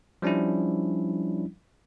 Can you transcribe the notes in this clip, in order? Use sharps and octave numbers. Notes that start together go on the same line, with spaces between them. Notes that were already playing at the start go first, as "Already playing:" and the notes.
F3 G3 C#4 D4 E4